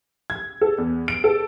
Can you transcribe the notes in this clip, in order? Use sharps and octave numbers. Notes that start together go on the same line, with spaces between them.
G#6
A4
E2
D7
A4